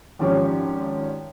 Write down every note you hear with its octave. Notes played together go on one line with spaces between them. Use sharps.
G#1 F3 C#4 G4 C#5